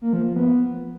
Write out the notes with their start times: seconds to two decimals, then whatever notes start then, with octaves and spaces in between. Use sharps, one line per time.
0.02 A#3
0.13 F3
0.25 F3
0.36 B3